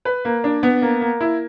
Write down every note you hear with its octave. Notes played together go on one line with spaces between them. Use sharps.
B4
A#3
D4
B3
A#3
A#3
E4